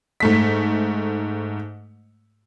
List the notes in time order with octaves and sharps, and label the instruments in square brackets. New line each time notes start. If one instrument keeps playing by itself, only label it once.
[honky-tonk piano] G#2 A3 B6